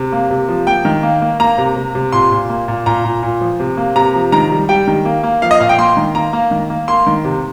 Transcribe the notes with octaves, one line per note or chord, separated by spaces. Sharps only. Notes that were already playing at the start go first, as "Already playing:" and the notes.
Already playing: C3
A#3
C3
F3
A#3 G5
D#3
A#3
A#3
A#3 A#5
C3
C3
C3
A#2 C6
A#2
A#3
A#2
A#2 A#5
A#2
A#2
F3
C3
A#3
C3 A#5
F3
D#3 A#5
G3
G3 G5
D#3
A#3
A#3
F3 F5
D#5
A#2 F5
G5
A#3 C6
D#3
A#3 A#5
A#3
D#3
A#3
A#3 C6
D#3
C3